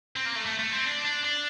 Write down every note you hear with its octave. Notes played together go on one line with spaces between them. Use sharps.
C4
A#3
A3
A3
A3
C4
D4
D4
D4